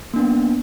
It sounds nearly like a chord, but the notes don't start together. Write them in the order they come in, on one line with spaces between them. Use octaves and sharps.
A#3 D4 B3